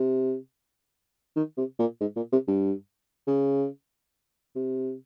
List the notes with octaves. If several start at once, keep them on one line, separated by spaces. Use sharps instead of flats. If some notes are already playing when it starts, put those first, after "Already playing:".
Already playing: C3
D#3
C3
A#2
G#2
A#2
C3
G2
C#3
C3